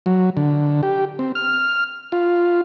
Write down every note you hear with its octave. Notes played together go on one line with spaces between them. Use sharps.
F#3
D3
G4
C4
F6
F4